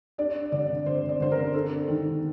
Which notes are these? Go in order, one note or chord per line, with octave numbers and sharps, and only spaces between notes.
D4 D5
D3 D5
D3 C5
D5
D3 C5
A#4
D4 A4
D#3